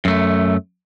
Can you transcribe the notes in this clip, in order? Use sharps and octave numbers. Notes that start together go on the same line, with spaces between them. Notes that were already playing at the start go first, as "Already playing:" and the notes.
F#2 A3